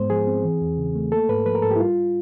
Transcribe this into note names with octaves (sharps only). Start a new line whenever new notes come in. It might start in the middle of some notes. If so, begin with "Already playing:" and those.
Already playing: G#2 G#3 B3 C5
F3 G#4
C4
E3
E2
C#3
A3
A#3 A4
G#2 B4
F3 B4
A#4
G#2 A4
G4
E4
G3 F4